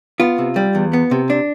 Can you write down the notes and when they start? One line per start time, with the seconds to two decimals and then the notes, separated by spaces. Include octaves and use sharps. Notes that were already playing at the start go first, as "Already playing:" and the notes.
0.20 B3 F4
0.38 C3
0.56 G3
0.75 E2
0.93 B3
1.11 C3
1.30 D4